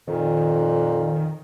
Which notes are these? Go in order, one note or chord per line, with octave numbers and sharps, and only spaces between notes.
F2 A#2 D#3